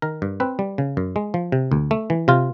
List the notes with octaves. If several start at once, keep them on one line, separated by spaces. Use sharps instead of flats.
D#3 A#4
G2
C4 B4
G3
C#3
F#2
G#3
F3
C3
D2
A3
E3
C3 F4